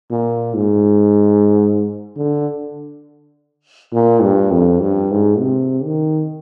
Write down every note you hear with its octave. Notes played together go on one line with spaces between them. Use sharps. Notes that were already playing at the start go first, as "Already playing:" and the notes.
A#2
G#2
D3
A#2
G2
F2
G2
G#2
C3
D#3